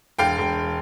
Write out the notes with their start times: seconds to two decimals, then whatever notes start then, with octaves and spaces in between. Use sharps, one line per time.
0.18 E1 F5 G5
0.38 E1